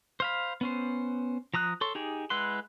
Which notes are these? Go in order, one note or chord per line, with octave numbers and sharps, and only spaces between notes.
C5 F5 B5
B3 C#4 C5
F3 A#5 D#6 F#6
A4 C#5 C6
D#4 G4 G#4
G#3 E4 B4 F#5 C6